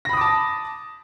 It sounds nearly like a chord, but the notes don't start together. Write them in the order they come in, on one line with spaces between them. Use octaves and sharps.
A#6 B5 D#6 D6 A5